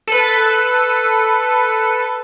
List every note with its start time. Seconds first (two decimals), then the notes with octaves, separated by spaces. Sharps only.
0.08 A4 B4